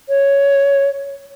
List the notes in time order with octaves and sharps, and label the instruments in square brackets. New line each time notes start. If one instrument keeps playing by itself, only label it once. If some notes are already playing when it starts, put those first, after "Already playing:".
[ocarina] C#5